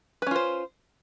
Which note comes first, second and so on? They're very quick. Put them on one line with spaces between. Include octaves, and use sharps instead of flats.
B4 C#4 F4 C5